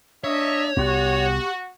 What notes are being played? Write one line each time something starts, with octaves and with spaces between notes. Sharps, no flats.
A#3 D4 C#5 D#5 E5
C2 B3 F#4 G4